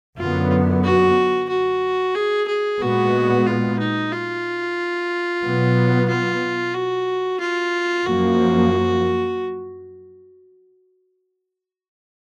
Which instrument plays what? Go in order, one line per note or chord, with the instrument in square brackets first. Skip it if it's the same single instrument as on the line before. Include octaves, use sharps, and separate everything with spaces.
[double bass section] F#2 D3 F#3 B3 [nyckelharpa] F4
[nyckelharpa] F#4
F#4
G#4
G#4
[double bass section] A#2 G#3 B3 [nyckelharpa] F#4
[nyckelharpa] F4
D#4
F4
[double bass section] B2 F#3 B3
[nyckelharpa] F4
F#4
F4
[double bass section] F#2 F3 A#3 [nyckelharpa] F#4